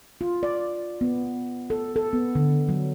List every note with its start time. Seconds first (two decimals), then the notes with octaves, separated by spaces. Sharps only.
0.21 F4
0.43 D5
1.01 B3
1.70 A4
1.96 A4
2.13 B3
2.35 D3
2.69 F#3